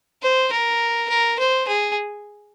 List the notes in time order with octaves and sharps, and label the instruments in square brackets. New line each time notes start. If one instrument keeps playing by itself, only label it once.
[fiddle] C5
A#4
A#4
C5
G#4